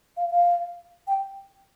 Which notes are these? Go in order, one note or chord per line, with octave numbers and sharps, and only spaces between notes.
F5
F5
G5